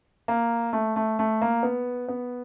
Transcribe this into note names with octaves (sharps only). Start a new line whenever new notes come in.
A#3
A3
A3
A3
A#3
B3
B3